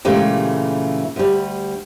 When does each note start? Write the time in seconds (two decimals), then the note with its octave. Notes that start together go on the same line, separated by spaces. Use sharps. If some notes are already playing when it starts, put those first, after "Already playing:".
0.05 A#2 C#3 E3 G#3 A3 G4
1.16 D2 G3